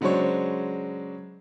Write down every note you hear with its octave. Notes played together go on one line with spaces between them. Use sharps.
C#3 F#3 G#3 D4 C5 C#5